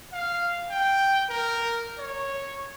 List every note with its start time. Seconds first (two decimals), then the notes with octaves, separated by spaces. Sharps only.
0.13 F5
0.70 G5
1.29 A#4
1.98 C#5